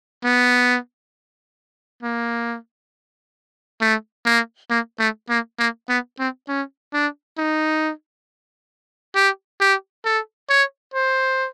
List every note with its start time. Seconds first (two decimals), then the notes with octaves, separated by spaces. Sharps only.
0.24 B3
2.03 A#3
3.81 A3
4.26 A#3
4.70 A#3
4.99 A3
5.30 A#3
5.59 A#3
5.89 B3
6.19 C4
6.48 C#4
6.93 D4
7.38 D#4
9.15 G4
9.61 G4
10.05 A4
10.49 C#5
10.94 C5